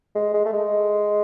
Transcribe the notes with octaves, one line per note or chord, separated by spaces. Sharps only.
G#3
G#3
A3
G#3